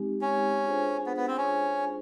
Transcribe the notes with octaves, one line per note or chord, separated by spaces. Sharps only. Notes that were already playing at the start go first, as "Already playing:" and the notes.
Already playing: G#3 C4 D#4 G4
C#4
D4 F4 G#4 C5
B3
B3
C4
C#4